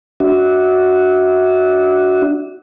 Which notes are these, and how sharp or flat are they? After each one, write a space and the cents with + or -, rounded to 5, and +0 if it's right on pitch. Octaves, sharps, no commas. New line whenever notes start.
D4 -5 F#4 +0 E5 -30